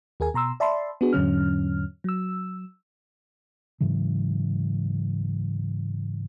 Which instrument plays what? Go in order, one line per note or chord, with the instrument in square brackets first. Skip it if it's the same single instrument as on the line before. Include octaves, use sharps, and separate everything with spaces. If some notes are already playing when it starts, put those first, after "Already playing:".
[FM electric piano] D#2 G#4 A#4 G#5
B2 A#5 C6 E6
D5 E5 A5 B5 C6
B3 D4 F#4 G#4
E2 G#2 D3 F#3 C#4 F6
F#3 E6
[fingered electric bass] G#2 C#3 E3 F#3